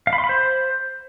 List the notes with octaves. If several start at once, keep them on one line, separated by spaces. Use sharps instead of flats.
F5
B5
C6
B5
C5